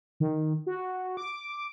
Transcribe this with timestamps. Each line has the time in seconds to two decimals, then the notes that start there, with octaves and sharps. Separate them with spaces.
0.20 D#3
0.67 F#4
1.17 D6